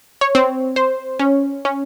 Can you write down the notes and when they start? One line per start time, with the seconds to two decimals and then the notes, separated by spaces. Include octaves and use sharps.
0.21 C#5
0.35 C4
0.76 C5
1.20 C#4
1.65 C#4